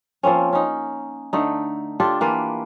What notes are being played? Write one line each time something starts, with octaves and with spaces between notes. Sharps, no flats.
F3 A#3 C4 C#4
C#4 D#4
D3 A3 D#4
D4 F4 G4 A4
E3 A#3 F4 B4